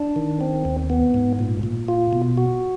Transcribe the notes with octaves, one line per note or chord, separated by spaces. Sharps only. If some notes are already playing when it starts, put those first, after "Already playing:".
Already playing: D4
D#3
C4
D#2
B3
G#2
A#2
A#2
F4
B2
F#4